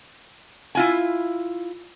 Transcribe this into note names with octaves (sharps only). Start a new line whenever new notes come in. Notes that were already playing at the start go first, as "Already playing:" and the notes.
E4 F4 G#5